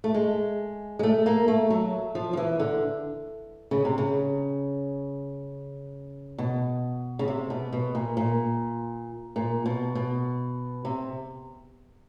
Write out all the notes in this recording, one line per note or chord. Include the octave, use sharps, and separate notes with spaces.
A3
G#3
G#3
A3
A#3
A3
F#3
F3
F3
E3
D3
C#3
C3
C#3
B2
C#3
C3
B2
B2
A#2
A#2
A#2
B2
B2
C3